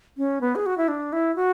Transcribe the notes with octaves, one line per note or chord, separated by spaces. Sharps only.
C#4
B3
G#4
F#4
E4
D4
E4
F#4